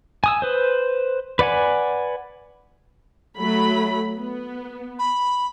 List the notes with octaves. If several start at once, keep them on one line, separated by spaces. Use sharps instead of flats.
G#5 D#6 E6
B4 C5
B4 D5 F#5 G#5
F#3 A3 B5
B3
B5